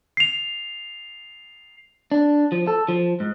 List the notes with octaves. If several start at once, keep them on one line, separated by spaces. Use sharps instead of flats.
C7 F7
D4
F3
A4
F3
G#2